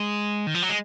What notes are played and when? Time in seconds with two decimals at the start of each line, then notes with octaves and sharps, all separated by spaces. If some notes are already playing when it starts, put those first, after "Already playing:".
Already playing: G#3
0.47 D#3
0.55 F3
0.62 F#3
0.69 G#3